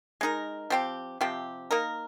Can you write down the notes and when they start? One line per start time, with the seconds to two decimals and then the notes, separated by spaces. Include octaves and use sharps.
0.21 G#3 D#4 A#4
0.70 F3 C4 G4
1.21 C3 F3 C4 G4
1.71 A#3 D#4 A#4